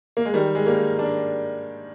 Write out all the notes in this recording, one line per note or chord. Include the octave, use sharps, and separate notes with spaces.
A#3
G#3
D#3 G3
G#3
G3 A#3
A#3 D4